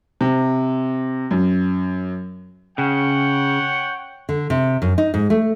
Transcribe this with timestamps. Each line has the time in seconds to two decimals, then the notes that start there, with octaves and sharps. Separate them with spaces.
0.21 C3
1.31 F#2
2.78 C#3 C#5 F#5 G5
4.29 D3
4.50 C3
4.82 F#2
4.98 D#4
5.14 G#2
5.30 A3